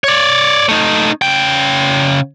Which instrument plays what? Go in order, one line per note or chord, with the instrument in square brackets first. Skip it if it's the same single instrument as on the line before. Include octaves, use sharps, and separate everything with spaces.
[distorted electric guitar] C#5 D5
A3 D#4
C#3 G5